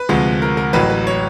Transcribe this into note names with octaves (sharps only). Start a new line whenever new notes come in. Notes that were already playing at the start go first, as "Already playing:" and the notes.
Already playing: B4
D2 C3 F3 G#3
A#4
A#4
A1 A2 F#3 B4
B4
C#5